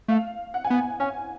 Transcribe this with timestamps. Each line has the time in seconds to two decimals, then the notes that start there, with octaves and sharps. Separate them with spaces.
0.08 A3 F5
0.54 F#5
0.64 G#5
0.70 B3 F#5
1.00 C#4 G#5